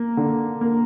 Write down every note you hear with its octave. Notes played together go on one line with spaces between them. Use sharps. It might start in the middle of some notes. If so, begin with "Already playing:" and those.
Already playing: A#3
D3
A#3